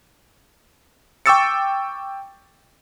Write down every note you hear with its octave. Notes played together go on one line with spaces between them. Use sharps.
G5 C#6 D6 E6 A6 C#7